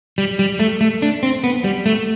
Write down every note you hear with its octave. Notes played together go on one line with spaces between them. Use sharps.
G3
G3
A3
A3
D4
C4
B3
G3
A3